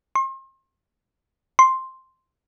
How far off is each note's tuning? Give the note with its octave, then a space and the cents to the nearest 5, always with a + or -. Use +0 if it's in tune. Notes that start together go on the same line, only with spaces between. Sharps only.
C6 +40
C6 +5